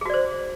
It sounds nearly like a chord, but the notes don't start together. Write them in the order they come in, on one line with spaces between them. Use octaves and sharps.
G#4 F#4 D5 C5